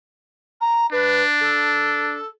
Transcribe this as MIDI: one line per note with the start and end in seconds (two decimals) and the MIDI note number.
0.61 0.86 82
0.92 2.20 62
0.92 1.23 71
1.41 2.28 69